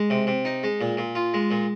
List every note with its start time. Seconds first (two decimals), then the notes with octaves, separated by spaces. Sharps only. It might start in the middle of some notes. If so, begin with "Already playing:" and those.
Already playing: G#3
0.10 C3
0.27 C3
0.45 D#4
0.63 G#3
0.81 A#2
0.97 A#2
1.15 F4
1.34 G#3
1.51 A#2